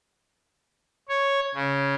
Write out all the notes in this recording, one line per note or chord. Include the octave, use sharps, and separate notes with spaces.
C#5
C#3